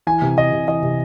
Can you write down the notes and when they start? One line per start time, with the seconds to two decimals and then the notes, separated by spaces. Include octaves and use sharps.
0.07 E3 G#5
0.22 C3
0.37 E3 D#5
0.52 C3
0.68 E3 D#5
0.83 C3